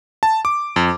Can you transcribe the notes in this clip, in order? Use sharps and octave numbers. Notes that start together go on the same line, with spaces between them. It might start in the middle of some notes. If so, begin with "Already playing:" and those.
A5
D6
F2